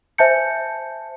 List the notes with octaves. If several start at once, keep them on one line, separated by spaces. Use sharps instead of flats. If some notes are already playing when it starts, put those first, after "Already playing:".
C5 E5 G#5 A5 G6 C#7